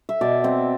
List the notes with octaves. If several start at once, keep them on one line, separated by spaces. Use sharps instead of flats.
E5
B2 D5
C4